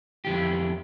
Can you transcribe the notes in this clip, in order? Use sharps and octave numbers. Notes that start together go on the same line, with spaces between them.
F2 E3 G4